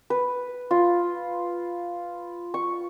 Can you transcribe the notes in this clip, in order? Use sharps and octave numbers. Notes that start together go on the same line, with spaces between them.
B4
F4
C#6